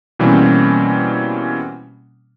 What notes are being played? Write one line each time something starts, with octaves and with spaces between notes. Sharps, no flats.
B2 E3 G3 A#3 C4 C#4